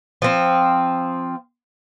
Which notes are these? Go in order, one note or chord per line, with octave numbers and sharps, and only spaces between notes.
F3 C4